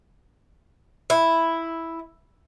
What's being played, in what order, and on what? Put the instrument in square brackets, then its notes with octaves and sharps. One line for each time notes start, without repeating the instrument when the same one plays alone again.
[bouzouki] E4